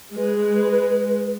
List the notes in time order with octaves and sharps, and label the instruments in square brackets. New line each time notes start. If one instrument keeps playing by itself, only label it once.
[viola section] G#3 [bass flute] B4